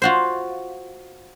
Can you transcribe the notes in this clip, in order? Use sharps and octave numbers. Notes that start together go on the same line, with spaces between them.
F4 F#4 C5